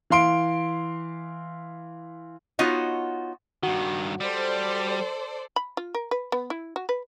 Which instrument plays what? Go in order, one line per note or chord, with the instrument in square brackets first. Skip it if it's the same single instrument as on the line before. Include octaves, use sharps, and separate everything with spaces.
[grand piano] E3 F5 C6 D7
[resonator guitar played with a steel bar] B3 D#4 F4 F#4 C#5 D#5
[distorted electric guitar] G2 D#3 [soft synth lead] F#4
[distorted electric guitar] G3 [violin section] A4 C5 D5
[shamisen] B5
F4
A#4
B4
B3
E4
F#4
B4